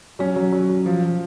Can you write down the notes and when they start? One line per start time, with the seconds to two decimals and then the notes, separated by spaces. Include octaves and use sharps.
0.19 F#3 C#4
0.36 F#3
0.52 F#3
0.69 F#3
0.86 F3
1.02 F3